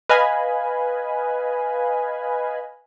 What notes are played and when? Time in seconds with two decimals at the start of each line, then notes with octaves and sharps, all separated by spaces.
0.09 B4 D#5 F5 G#5 B5